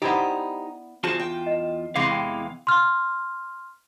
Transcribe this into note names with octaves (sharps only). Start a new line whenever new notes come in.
B3 D#4 E4 G4 C5 D5
E2 F4 F#4 G#4 C5 A5
G5
D#5
E2 C3 E3 G#3 F5 C#6 D6
G5
C6 F6